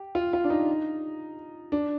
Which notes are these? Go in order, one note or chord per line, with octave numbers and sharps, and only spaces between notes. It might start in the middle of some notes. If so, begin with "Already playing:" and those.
Already playing: G4
F4
F4
D4
D#4
D4